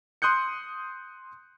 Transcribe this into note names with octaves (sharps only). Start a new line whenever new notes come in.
C6 D#6 F#6 G6 C#7